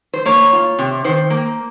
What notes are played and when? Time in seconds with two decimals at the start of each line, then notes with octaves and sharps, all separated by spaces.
0.14 C5
0.26 A#3 C#5
0.53 F4
0.79 C3
1.04 D#3 C5
1.30 A#3